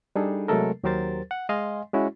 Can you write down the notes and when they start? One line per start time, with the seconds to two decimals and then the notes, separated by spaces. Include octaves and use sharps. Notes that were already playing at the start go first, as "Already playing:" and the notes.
0.16 G3 D4 D#4 G#4 A4
0.48 C3 F#3 G#3 A3 A4 A#4
0.83 D#2 F#3 G4 A#4 C5 A6
1.31 F#5
1.49 G#3 D#5 F5 G#5 C6
1.94 G#3 C#4 E4 F#4